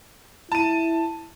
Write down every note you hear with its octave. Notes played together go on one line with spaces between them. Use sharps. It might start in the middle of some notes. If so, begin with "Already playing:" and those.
E4 A5 D#7